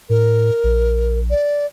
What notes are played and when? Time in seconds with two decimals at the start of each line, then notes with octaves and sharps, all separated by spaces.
0.09 A2 A#4
0.64 A#1
1.30 D5